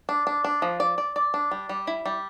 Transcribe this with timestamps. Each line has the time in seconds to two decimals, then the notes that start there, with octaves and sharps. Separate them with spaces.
0.09 D4
0.27 D4
0.44 D4
0.62 F3
0.80 D5
0.98 D5
1.16 D5
1.34 D4
1.51 G3
1.69 G3
1.87 E4
2.05 G3